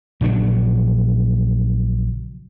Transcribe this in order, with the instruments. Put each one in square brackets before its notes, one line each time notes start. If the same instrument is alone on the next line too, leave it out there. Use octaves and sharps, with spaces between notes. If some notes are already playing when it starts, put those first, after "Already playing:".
[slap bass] A#1 C#3 F#3 D4